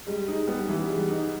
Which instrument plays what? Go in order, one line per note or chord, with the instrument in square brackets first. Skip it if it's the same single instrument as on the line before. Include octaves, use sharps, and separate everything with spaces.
[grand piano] G3 [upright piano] G#3
[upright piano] G#3 [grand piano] D#4
[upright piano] G3 [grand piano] B3
[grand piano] E3 [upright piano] G3
[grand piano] G3 [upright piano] G#3
[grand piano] D#4